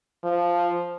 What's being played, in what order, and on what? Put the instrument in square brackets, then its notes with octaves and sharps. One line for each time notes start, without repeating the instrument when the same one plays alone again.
[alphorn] F3